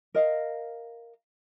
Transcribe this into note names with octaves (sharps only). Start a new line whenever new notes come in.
A#4 D#5 F5